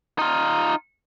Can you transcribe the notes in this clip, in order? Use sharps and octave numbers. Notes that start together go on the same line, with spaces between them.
D#4 F4